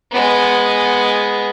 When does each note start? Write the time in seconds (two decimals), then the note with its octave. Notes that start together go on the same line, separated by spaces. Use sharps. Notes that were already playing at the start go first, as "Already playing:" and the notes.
0.11 G#3 B3